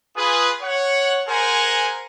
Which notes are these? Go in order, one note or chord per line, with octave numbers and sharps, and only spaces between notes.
F4 G#4 B4
C#5 F#5
G#4 A#4 C5 F#5 G#5 A#5